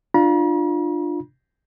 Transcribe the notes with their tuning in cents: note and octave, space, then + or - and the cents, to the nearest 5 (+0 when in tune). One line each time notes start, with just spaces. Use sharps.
D4 +25 F4 +0 A#5 +45